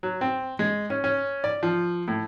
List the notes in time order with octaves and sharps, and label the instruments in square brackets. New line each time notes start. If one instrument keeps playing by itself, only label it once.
[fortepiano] F#3
C4
G#3
C#4
C#4
D5
F3
A2